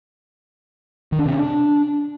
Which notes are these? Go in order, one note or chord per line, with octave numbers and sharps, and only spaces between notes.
D#3
D4
C3
C#4
D4